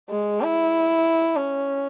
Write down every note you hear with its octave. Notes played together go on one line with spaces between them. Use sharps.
G#3
E4
C#4